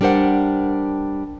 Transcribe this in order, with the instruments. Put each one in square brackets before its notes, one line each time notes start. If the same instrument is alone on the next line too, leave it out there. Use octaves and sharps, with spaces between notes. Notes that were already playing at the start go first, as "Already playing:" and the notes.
[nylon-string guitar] G3 D4 A#4 C5 F#5